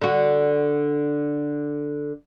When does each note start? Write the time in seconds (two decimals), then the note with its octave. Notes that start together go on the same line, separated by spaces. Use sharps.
0.01 D3 F#4